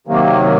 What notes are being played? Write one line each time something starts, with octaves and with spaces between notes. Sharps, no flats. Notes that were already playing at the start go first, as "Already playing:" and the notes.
C3 D#3 F#3 A#3